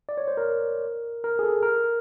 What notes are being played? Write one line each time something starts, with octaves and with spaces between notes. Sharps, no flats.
D5
C#5
C5
A#4
A#4
G#4
A4
A#4